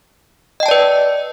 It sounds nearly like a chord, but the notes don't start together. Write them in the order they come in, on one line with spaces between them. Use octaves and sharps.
D#5 G5 A5 D5 B4